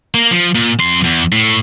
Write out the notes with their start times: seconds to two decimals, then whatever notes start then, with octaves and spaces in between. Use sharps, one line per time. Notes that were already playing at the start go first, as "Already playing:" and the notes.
0.14 A#3
0.31 F3
0.55 A#2
0.79 F2 C6
1.04 E2
1.32 A2